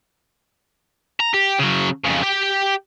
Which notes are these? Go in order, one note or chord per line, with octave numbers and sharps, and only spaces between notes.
A#5
G4
C#3 F#3
F2 C#3
G4 G5